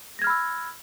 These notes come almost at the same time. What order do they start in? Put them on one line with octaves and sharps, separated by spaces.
A#6 G#6 F6 B5 E6